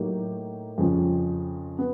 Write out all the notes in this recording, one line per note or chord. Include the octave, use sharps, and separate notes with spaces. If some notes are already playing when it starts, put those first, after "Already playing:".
Already playing: A2 F#3 A#3 D#4 G4
F2 C#3 F3
B3